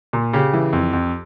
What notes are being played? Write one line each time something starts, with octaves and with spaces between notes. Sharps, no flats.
A#2
C#3 G4
E3
F2
F2